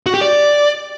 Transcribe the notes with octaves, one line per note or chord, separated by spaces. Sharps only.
F#4
G4
D5